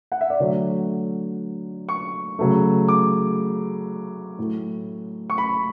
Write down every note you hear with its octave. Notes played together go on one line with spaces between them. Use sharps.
F#5
E5
D5
D3 F#3 A3 C#5
C#6
C#3 F#3 A3
D6
A2 F#3 A3
C#6
B5